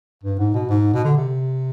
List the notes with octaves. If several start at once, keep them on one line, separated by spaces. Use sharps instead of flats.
G2
G#2
B2
G#2
B2
D3
C3